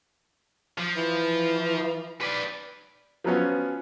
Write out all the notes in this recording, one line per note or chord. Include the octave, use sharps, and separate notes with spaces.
F3
E3
B4 D5
F3 F#3 B3 C#4